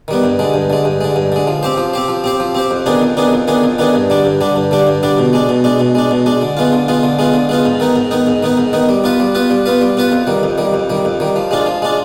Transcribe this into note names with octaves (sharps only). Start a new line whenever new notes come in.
D#3 G3 B3
G2
D3 G#3
G2
D3 G#3
G2
D3 G#3
G2
D3 G#3
F3
C4 G4 C5
F3
C4 G4 C5
F3
C4 G4 C5
F3
C4 G4 C5
F2
D#3 B3 D4 G#4
F2
D#3 B3 D4 G#4
F2
D#3 B3 D4 G#4
F2
D#3 B3 D4 G#4
G2
D3 G3 D4
G2
D3 G3 D4
G2
D3 G3 D4
G2
D3 G3 D4
B2
G#3 D4
B2
G#3 D4
B2
G#3 D4
B2
G#3 D4
D3
G#3 B3 F4
D3
G#3 B3 F4
D3
G#3 B3 F4
D3
G#3 B3 F4
G#2
D#3 B3 D#4
G#2
D#3 B3 D#4
G#2
D#3 B3 D#4
G#2
D#3 B3 D#4
G3
B3 F4 B4
G3
B3 F4 B4
G3
B3 F4 B4
G3
B3 F4 B4
F2
D#3 G3
F2
D#3 G3
F2
D#3 G3
F2
D#3 G3
F3
G#3 D4 F4
F3
G#3 D4 F4